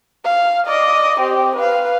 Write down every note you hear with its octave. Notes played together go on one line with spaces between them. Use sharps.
F5
D5 D#5
C4 G4
B4 F5